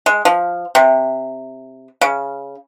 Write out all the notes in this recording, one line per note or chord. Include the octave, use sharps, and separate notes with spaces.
G#3
F3
C3
C#3